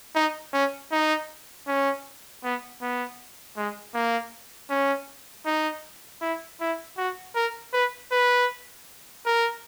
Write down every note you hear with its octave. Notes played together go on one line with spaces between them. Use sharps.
D#4
C#4
D#4
C#4
B3
B3
G#3
A#3
C#4
D#4
E4
E4
F#4
A#4
B4
B4
A#4